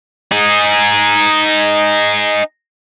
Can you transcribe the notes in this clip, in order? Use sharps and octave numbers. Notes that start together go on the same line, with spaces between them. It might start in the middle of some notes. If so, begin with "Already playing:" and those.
D#4 G#4